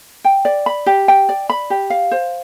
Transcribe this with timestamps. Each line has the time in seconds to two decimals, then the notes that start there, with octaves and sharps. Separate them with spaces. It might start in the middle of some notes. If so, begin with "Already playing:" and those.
0.24 G5
0.45 D5
0.66 B5
0.86 G4
1.08 G5
1.29 D5
1.50 B5
1.70 G4
1.90 F5
2.11 C5